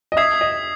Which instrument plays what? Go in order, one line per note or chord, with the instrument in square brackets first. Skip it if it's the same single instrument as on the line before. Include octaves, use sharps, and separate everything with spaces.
[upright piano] D#5
[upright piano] E5 [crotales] D#6 G#6 C7
[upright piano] D#5